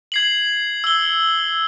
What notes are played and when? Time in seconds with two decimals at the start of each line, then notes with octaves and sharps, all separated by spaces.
0.12 G#6 C7 F#7
0.84 E6 G7